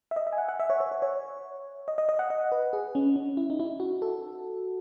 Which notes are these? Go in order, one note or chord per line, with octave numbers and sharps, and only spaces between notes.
E5
D#5
E5
G#5
F#5
F#5
E5
C#5
C#5
C#5
C#5
D#5
D#5
D#5
F#5
D#5
B4
G#4
C#4
C#4
E4
D#4
E4
F#4
A4